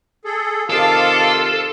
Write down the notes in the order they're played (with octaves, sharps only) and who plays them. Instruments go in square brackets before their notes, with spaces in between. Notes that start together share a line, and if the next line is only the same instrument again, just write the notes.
[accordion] G#4 A4
[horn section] C3 D#3 F4 [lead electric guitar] A4 [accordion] F5 A5 D6